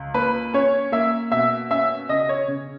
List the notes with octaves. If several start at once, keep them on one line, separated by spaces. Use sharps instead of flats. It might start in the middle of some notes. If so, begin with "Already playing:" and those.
Already playing: C#2
A#3 B4
C#4 C#5
A#3 E5
B2 E5
C#4 E5
C#3 D#5
C#5
C#3